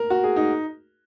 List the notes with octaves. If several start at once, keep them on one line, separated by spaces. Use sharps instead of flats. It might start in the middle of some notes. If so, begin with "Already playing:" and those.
Already playing: A#4
F#4
G#4
D#4